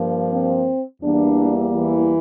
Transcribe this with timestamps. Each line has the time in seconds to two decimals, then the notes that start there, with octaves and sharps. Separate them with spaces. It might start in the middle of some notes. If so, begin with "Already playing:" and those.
Already playing: G2 F3 A#3
0.29 C4
1.01 E2 E3 G3 A#3 D4
1.73 E3 E4